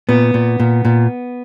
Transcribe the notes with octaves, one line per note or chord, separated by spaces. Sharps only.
A#2 B3
A#2
A#2
A#2